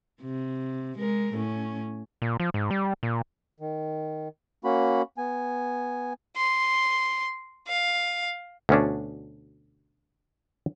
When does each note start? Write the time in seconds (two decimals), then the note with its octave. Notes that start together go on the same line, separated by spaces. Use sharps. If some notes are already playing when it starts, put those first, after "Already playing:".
0.22 C3
0.98 G#3 A#4
1.34 A2 C#4
2.22 A#2
2.40 F3
2.54 G#2
2.71 G3
3.03 A#2
3.60 D#3
4.64 A#3 C#4 F#4 B5
5.18 B3 G#5
6.36 C6
7.68 F5
8.69 D2 B2 C#4 D4